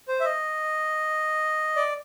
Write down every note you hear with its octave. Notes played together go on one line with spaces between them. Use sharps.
C5
E5
D#5
D5